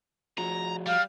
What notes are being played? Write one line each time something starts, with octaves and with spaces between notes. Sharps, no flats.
F3 F#4 G#4 A#5
G3 F5